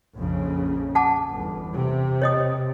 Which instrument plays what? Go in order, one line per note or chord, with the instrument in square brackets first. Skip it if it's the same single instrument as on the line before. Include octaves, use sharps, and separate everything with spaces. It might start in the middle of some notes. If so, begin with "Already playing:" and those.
[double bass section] A#1 F2 C#3
[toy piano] F#5 A5 D6
[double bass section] G1 E2
C3
[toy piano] C#5 D#5 D#6